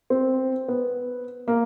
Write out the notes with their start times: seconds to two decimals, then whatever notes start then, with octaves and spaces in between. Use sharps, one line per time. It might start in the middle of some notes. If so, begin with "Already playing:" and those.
0.10 C4
0.68 B3
1.48 A#3